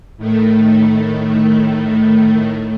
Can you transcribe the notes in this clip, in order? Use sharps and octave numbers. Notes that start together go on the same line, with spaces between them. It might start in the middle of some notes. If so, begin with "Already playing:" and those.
A2 D#3 A3